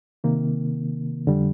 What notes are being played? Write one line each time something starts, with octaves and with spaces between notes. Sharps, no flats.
C3 D#3 A#3
F2 D3 G3